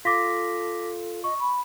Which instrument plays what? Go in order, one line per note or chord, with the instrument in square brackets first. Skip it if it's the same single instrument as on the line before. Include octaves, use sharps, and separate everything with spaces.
[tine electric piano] F4 [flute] A4 [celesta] D6 A#6 B6
[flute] D#5 [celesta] C#6
[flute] B5